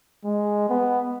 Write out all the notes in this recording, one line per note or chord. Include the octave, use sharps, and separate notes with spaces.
G#3
B3